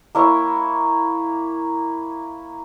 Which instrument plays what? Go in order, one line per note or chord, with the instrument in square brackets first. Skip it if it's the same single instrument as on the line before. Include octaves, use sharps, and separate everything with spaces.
[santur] A#3 E4 C#5